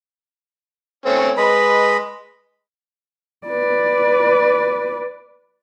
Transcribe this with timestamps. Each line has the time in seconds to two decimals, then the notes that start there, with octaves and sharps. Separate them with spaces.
1.06 A3 C4 C#4
1.37 G#3 B4 D#5 B5
3.47 B4 D5